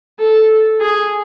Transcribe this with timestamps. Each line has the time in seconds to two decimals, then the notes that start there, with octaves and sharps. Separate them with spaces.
0.19 A4
0.81 G#4